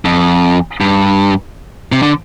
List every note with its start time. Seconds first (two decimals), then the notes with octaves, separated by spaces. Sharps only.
0.05 F2
0.81 G2
1.92 C3
2.02 D3